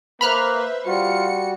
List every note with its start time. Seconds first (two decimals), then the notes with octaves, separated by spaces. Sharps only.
0.21 A#3 B4 C5 E5 B5 F6 F#6
0.87 G3 F4 F#4 C#7